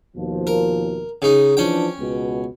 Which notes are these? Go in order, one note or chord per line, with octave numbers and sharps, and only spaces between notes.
D#2 B2 F3
A#4
C#3 D#4
E3 F3 C#4 D4 G5
C#2 B2 B3